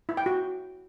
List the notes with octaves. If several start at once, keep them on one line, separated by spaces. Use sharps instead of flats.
E4
G5
F#4